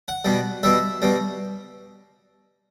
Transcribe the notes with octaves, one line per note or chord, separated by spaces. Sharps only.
F#5
B2 G3
B2 G3 E5
B2 G3